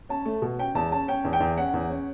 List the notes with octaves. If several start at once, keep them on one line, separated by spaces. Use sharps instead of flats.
C#4 A5
A3
B2
C#4 G5
E2 A5
C#4 A5
C#4 G5
E2
G5
E2
C#4 F#5
E2
C#4